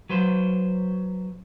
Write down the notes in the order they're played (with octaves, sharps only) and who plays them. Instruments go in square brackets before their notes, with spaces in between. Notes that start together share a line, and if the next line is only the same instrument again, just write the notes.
[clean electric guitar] F#3 B4 C5